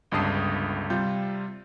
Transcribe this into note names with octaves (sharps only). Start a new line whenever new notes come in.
G1 C#2 G2 A5 D#6 C7
C3 G3 F4 G6